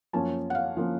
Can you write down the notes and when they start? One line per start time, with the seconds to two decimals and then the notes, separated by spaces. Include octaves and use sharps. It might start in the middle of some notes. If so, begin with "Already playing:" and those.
0.13 F#2 F3 A#3 C#4 A5
0.50 F#5
0.55 F5
0.77 F3 A#3 C#4